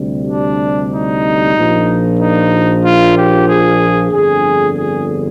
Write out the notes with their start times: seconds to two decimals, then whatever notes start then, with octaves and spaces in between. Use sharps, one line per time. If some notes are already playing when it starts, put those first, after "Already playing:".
Already playing: D2 C3 G3
0.27 D4
0.92 D#4
1.55 A#1 A#2 F3
2.19 D#4
2.83 F4
3.16 G4
3.48 G#4
4.12 G1 F2 D3 G#4
4.77 G#4